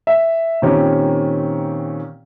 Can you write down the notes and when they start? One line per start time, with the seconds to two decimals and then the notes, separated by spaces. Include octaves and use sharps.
0.07 E5
0.62 A#2 D#3 C4 C#4 G4